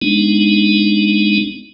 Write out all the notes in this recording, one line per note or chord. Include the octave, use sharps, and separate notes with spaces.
G#3 B3 D4 D#4